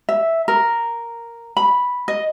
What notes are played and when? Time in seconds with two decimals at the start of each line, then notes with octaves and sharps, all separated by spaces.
0.09 E5
0.48 A#4
1.57 B5
2.08 D#5